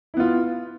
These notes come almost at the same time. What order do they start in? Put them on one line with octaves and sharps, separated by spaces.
E4 B3 F4